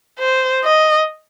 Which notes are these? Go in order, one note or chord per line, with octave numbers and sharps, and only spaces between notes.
C5
D#5